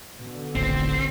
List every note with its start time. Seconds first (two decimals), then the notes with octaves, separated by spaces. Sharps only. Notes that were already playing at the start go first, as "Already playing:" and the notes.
0.18 B2 D3
0.55 D#1 A1 C4